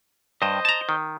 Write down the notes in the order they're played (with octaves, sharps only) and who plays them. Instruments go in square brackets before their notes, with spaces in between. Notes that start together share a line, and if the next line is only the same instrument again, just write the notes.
[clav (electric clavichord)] G2 [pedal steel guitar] C5 D#5
[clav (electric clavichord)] A5 A#5
D#3